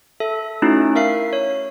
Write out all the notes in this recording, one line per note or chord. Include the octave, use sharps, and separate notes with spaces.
A4 E5
A3 C#4 D#4 E4 F#4
A#4 E5 F5 C7
C#5